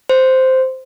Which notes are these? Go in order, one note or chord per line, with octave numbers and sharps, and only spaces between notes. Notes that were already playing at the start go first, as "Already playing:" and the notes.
C5